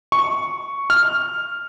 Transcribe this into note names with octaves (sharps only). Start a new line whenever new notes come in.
C#6
F6